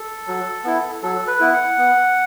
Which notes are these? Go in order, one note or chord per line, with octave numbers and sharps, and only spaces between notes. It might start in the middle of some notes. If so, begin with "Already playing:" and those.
Already playing: A4
F#3
B3 E4
F#3 A4
B4
B3 E4
F#5
B3